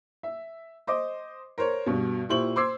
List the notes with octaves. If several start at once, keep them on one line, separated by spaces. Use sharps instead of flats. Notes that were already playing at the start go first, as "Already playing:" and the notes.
E5
C5 D#5 D6
A#4 C5 C#5
G2 B2
A#2 E4 G4 C5 C#6 F#7
C5 C6 D6 E6 G#6 C7